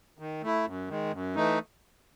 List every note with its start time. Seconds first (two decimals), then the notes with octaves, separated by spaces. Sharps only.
0.19 D#3
0.43 A3 E4
0.66 F#2
0.88 D#3 G#3
1.13 F#2
1.35 E3 A3 D#4